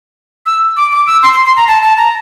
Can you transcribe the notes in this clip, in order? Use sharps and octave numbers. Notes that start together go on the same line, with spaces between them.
E6
D6
D6
E6
C6
C6
C6
A#5
A5
A5
A#5